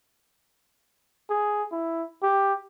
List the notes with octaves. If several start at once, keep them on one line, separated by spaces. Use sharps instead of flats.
G#4
E4
G4